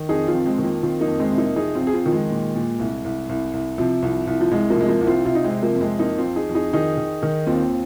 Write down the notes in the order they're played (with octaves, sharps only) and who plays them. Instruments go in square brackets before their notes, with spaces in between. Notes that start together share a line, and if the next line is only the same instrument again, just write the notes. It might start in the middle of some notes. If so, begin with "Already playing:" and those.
Already playing: [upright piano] D#3
F2 D#4 G#4
C4 F4
F2
G#3 C4
D#3
F3 A#3
D#3 C4 F4
A#3 D#4
F2
G#3 C4
C3
A#3 D#4
F2 D#4 G#4
C4 F4
F2
G#4
C4 F4
D#3 F3
G#3
A#2
A#2
C2
C2
C2
C2
C3 F3
C2
C2
F3
C2 G#3
F3 A#3
C3 G#3
F3 A#3
C2
C4 F4
C3 C4 F4
D#4
G#3 C4
C3
F3 A#3
F2
G#3 C4
F2 A#3 D#4
C4 F4
F2
D#4 G#4
F2
D#4 G#4
D#3 D#4 G#4
D#3
D#3
D#2 C4 F4